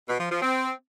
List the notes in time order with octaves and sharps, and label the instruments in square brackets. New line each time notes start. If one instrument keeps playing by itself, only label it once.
[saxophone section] B2
F3
F3
C4